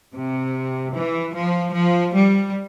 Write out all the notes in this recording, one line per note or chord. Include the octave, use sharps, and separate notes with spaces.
C3
E3
F3
F3
G3